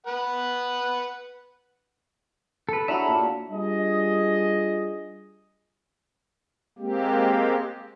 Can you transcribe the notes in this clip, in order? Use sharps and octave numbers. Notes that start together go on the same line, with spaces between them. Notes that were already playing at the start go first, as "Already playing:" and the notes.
B4 F#5
A4 B4
D4 E4 F#4 A4 C#5 E5 A#5 B5
A#2
G3 D4 F4 G#4 D#5
G#3 A#3 C4 G4